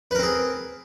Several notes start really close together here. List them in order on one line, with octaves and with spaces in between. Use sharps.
B4 A#4 C4 G#4